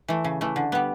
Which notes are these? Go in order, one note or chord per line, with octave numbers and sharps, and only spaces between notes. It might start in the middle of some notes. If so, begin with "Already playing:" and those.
E3 A3
C#3
E3 A3
D3
G3 B3